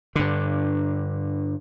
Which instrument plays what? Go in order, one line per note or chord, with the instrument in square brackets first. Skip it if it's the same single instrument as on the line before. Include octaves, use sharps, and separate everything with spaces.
[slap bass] G2 D3